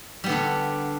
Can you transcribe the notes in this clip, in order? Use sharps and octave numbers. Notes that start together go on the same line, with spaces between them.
D3 G3 B3 D4